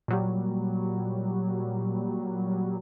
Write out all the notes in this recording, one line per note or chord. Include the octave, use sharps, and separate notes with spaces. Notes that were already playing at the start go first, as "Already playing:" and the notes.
A#2 F#3 G3